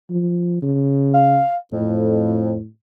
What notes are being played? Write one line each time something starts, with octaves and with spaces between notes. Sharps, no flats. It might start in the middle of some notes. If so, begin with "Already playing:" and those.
F3
C#3
F5
F2 A2